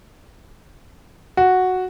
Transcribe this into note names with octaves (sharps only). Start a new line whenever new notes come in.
F#4